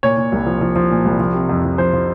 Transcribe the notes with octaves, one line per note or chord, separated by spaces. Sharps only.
A#2 C#5
A#2
C2
F3
F3
F3
A#2
C2
F3
C3
F2
F3
F3 C5
F3